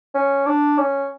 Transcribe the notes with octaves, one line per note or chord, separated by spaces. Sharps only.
C#4
D4
C#4